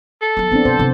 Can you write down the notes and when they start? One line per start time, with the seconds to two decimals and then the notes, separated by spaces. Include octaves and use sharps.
0.22 A4
0.37 F#3 B3
0.51 F3 B3 C4 D4 E4
0.65 B2 C5
0.79 C3 E3